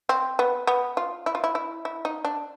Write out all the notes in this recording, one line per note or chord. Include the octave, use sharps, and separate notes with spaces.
C4
B3
B3
F4
E4
F4
E4
E4
E4
D#4
D4